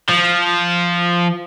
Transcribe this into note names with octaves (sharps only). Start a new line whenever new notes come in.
F3